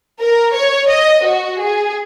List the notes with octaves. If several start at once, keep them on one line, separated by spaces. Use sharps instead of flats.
A#4
C#5
D#5
F#4
G#4